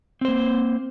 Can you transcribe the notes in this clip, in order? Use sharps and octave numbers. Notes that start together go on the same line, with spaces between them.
A#3 C4 C5